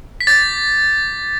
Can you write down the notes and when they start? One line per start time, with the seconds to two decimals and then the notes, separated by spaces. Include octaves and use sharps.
0.21 B6
0.27 D6 G6 A6